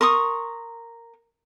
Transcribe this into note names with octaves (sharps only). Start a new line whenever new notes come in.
A#4 C6 C#6 D#6